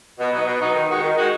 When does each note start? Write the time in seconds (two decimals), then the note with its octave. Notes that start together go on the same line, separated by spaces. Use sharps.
0.19 B2
0.32 F#3 B3 D#4
0.47 B2
0.60 F#3 B3 D#4
0.75 D#3
0.89 G#3 D#4 F#4
1.02 D#3
1.18 G#3 D#4 F#4